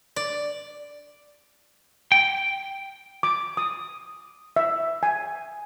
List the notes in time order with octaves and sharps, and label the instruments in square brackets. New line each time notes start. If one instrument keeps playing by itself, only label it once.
[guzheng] D5
[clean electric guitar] G5
[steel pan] D6
D#6
E5
G#5